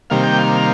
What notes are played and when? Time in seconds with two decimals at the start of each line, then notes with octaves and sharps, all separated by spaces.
0.10 C3 D#3 G3 A#3 F5
0.24 G5
0.38 F5